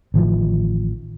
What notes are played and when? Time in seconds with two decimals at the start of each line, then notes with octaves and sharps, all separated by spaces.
0.14 A1 D#3 F3